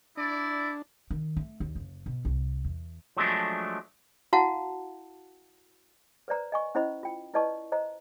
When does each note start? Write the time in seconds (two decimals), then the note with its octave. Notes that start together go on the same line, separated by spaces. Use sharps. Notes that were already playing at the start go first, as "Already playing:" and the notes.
0.17 D4 E4 D5
1.11 D#3
1.37 A3
1.60 D#2
1.76 F#1
2.06 B2
2.25 C2
2.65 E2
3.17 F3 F#3 G#3 A3 D4
4.33 E4 F#4 F5 F#5 A5
6.28 B4 C5 D5 A#5
6.52 D#5 G#5 C#6
6.75 C#4 E4 C5 D#5 B5
7.03 F4 G5
7.34 E4 B4 D5 D#5 A5 C#6
7.72 C5 D#5 A#5